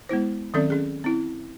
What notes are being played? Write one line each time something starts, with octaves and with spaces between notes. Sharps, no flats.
G#3 B3 E4 C5
D#3 F#3 C4 C#4 A4 D5
C#4 G#4
C4 E4